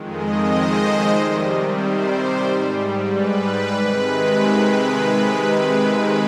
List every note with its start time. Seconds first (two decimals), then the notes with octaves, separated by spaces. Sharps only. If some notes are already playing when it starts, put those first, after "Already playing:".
Already playing: F2 D#3 G#3
0.10 D#5
0.43 C5
1.08 C3 D#3 G3
1.75 C5
2.41 G#2 G3
3.07 B4
3.73 C3 D#3 G#3 B4